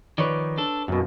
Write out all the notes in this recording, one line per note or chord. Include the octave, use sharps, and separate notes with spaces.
D#3 F3 B4 C#5 D5
D4 A4
B1 F#2 B2